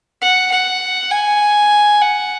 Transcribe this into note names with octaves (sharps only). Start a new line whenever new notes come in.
F#5
F#5
G#5
F#5